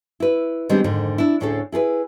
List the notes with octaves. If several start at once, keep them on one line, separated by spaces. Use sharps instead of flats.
E4 B4
D#3 G3 G#3 B3 C4 D4
F2 G#2 D3 D#3
D4 E4
D2 A2 C#4 D4 G#4 A4
E4 G#4 A4 B4